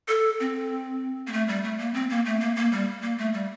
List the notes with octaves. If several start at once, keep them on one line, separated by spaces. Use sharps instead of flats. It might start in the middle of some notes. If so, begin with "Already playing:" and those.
A4
C4
A#3
A3
G3
A3
A#3
C4
A#3
A3
A#3
A#3
G3
A#3
A3
G3